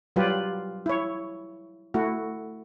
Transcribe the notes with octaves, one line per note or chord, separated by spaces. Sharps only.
F#3 G3 F4 G4 B4
E4 C#5
A3 E4 F#4